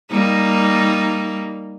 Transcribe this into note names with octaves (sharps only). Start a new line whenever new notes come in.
G3 A#3 D#4